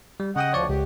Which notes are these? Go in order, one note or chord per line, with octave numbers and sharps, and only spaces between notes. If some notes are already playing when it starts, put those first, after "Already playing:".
G3
C#3 D#5 F#5 G5 D#6
D2 F3 C#5 D5 C#6
C#2 G4